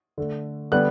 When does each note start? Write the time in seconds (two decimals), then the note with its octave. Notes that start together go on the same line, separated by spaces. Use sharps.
0.18 D3 A3
0.72 D3 G3 B3 F#5 F#6